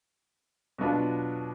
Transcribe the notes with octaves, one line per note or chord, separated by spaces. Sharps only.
B2 F#3 B3 D4 F4